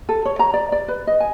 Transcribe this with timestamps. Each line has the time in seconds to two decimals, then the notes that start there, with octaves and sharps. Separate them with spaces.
0.09 A4
0.25 C#5
0.39 A#5
0.54 D5
0.72 D5
0.88 B4
1.07 D#5
1.20 G#5